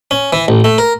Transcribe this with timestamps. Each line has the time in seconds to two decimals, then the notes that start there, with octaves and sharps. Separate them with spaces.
0.11 C#4
0.33 E3
0.48 A1
0.64 A3
0.78 A#4